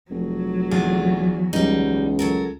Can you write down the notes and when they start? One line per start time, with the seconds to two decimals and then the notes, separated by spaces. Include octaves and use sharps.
0.11 F1 F#3
0.71 E2 D4 F4 G#4
1.53 C#2 G3 D#4
2.19 F#3 A4 A#4